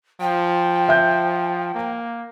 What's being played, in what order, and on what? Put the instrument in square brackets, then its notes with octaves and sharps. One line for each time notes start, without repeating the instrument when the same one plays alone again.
[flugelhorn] F3 [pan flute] G5
[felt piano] E5 G6
[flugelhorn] A#3